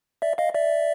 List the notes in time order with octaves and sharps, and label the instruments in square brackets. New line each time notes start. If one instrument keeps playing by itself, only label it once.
[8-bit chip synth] D5 E5
D#5 F5
D5 E5